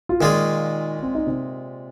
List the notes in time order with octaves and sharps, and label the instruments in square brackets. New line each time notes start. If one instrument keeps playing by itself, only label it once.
[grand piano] F4
[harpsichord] A#2 G#3 F4 G#4 [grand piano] D#3 D#4
[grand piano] C4
D#4
C3 C4